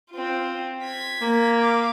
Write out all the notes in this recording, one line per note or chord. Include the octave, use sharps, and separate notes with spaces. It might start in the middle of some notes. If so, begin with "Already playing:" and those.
C4 F4
G#6 B6
A#3
F5 D6